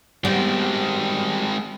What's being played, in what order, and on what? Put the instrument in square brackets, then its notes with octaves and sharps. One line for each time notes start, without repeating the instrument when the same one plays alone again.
[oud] G3 B3 [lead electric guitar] G#3 C4